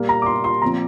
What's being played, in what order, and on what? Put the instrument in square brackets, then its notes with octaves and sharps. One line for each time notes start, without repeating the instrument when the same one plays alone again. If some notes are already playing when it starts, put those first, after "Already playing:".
Already playing: [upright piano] A#2 G3 A#3
A#5
D6
C6
C6
A#2 F3 C4 A#5